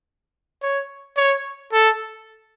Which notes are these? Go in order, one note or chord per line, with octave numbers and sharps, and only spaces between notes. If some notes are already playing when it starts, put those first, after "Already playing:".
C#5
C#5
A4